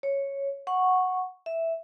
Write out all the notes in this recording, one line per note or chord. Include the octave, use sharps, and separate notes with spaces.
C#5
F#5 C#6
E5